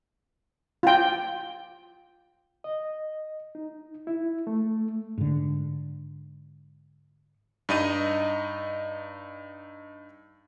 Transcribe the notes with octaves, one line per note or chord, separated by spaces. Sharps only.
F4 G5
D#5
D#4
E4
A3
G#2 D3
G2 D#4 D#5 D#7